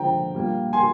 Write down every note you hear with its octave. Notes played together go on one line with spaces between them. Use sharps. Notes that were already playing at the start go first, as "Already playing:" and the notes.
Already playing: D3 F3 G#3 D4 G5 A#5
A#2 G3 A#3
G#5 C6